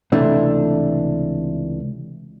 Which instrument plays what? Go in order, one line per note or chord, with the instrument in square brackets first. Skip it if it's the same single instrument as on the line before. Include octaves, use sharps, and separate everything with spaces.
[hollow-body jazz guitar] C#2 C3 E3 A3 D4